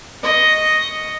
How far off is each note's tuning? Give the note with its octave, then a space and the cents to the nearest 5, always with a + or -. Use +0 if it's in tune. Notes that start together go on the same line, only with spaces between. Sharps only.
D#5 +0 C#6 +0